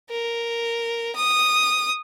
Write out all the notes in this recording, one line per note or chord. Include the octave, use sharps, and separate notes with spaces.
A#4
D#6